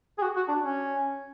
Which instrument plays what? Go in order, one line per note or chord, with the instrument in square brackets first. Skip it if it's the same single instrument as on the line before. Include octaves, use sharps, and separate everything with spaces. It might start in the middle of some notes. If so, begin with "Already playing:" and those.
[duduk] G#4
F#4
F#4
D4
C#4